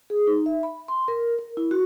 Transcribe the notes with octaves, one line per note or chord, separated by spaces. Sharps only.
G#4
D#4
E5
B5
C6
A#4
A#4
E4
F#4